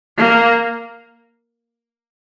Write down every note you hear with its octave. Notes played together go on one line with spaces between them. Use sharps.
A#3